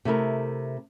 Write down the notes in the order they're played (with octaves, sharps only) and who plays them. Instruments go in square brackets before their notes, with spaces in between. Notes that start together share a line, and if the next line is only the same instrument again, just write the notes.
[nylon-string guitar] C3 A3 E4 A#4